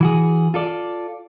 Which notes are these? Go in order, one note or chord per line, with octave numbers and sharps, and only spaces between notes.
E3 F#4 G#4
F4 A4 D5